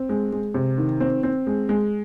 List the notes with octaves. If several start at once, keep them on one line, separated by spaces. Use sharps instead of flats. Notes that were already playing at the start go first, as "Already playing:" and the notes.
Already playing: C4
G#3
G#3
C3
D#3
C4
C4
G#3
G#3